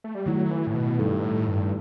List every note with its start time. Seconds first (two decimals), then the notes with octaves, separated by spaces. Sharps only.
0.04 A3
0.15 G3
0.26 D#3 F#3 A3 E4
0.51 E3
0.67 A2
0.75 B2
0.99 G2 G3 D#4 A4
1.23 A2
1.48 G2